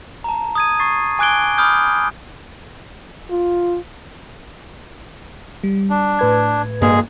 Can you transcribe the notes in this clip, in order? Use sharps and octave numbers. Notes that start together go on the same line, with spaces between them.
A5 A#5
D#6 G#6 D#7
C#6 A6 C7
G#5 D6 F#6 G#6 D7 G7
B5 D6 D#6 F6 G6
F4
G3
D4
A2 B4 G#6
G2 G#3 A#3 G#4